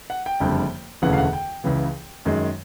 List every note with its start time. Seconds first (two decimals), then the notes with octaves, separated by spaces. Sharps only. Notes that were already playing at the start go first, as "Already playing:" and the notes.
0.10 F#5
0.26 G5
0.40 F#1 F2 D3 G3
1.02 E1 D2 C#3 E3 A3 F#5
1.13 F5
1.18 F#5
1.33 G5
1.64 C#2 C#3 E3
2.25 F#2 D#3 G#3